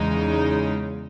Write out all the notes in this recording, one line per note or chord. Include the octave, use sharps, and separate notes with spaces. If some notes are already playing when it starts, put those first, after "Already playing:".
Already playing: E2 C#3 G#3 D#4